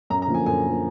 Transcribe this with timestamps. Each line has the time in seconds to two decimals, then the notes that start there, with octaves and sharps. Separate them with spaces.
0.10 F#2 A#5
0.22 A#5
0.28 D3 F3 A#3
0.34 G#5
0.46 F#2 G#5
0.65 D3 F3 A#3